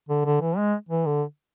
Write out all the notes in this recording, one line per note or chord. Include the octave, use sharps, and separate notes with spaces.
D3
D3
E3
G#3
E3
D3